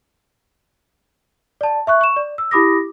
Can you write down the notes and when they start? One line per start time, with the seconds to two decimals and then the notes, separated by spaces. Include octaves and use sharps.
1.61 D5 A5
1.87 E5 C#6 F#6
2.01 C#6 E7
2.16 D5
2.38 E6
2.51 E4 G4 B5 D6 D#6 A#6